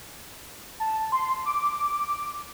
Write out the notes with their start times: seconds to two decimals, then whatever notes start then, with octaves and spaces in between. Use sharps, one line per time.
0.80 A5
1.12 C6
1.45 D6